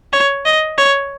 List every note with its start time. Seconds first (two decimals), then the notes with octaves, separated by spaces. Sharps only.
0.13 C#5
0.45 D#5
0.78 C#5